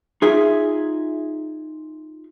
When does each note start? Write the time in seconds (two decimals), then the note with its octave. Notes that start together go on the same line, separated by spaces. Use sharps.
0.22 D#4 F4 G#4 E5